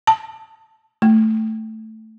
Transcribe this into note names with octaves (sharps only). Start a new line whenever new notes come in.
A5
A3